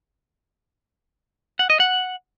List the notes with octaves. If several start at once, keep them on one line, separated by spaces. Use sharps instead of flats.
F#5
D#5
F#5